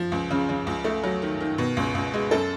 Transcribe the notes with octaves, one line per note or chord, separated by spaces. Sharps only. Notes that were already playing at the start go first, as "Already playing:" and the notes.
Already playing: F3
C#2
C#3
C#3
C#2
A3
F#3
D#3
D#3
B2
C#2
C#2
G#3
F#2 A4